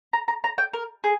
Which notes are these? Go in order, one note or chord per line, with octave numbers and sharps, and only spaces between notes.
A#5
A#5
A#5
G5
A#4
G#4